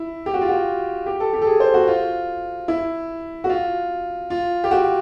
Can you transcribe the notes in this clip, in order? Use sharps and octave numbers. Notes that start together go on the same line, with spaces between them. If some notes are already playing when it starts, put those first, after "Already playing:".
Already playing: E4
G4
F#4
F4
F#4
G4
A4
G4
A4
G#4
C5
F#4
F4
E4
F#4
F4
F4
G4
F#4